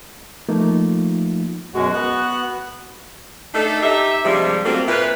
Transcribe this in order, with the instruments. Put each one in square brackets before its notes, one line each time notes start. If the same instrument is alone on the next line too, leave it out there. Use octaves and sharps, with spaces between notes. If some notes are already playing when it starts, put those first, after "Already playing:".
[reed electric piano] F3 A3 A#3 D#4 F4
[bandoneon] F#2 B2 G#3 [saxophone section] F#4
[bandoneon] B3 F#6
[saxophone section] A3 D4 D#4 A4
D#4 G4 E5
G2 C3 F3 G3 G#3
F#3 A3 A#3 C4 F4
A#2 E4 F4 B4